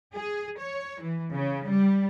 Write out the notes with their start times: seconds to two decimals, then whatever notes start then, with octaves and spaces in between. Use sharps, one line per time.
0.14 G#4
0.57 C#5
1.01 E3
1.33 C#3
1.67 G3